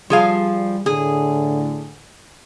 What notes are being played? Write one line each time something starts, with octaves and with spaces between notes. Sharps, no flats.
F3 G3 G#4 F5
A2 D3 G#4